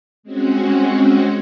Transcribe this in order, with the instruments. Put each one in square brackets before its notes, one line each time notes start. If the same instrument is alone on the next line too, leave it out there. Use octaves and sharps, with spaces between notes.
[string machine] G#3 C4 C#4 F#4